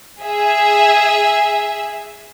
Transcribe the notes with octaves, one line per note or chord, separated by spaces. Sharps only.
G#4 E5